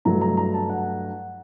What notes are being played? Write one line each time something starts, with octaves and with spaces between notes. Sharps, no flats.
G2 F#3 A3 A#5
A#5
A#5
A5
F#5